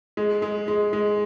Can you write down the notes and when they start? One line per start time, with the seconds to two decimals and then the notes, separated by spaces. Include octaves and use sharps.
0.17 G#3
0.42 G#3
0.68 G#3
0.93 G#3